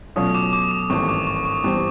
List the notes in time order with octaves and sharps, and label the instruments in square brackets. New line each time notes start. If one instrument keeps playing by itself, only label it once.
[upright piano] B2 F#3 A3 C#4 F4 [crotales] D#6
[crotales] D6
D6
D6
[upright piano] G#1 G2 E3 A3 C#4 [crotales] C#6
[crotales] D6
C#6
C#6
[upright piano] G2 E3 G3 C4